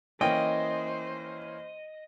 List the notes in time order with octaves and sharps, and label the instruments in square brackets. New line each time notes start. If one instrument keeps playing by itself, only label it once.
[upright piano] E3 A#3 C#4 [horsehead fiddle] C5 [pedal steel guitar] D#5 [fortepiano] G5